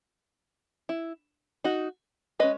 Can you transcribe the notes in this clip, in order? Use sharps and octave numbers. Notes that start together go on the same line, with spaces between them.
E4
D#4 F#4
G#3 C#4 B4 D#5